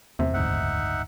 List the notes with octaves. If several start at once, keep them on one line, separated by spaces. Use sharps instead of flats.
E2 C3
F#1 D2 G#2 D#4 E5 F#5